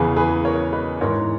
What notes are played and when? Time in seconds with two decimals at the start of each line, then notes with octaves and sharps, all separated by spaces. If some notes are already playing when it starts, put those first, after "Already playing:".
Already playing: E2 C#3 E3 G#4 B4
0.16 G#4 B4
0.45 A#4 C#5
0.73 B4 D#5
1.01 G#2 E3 A#4 C#5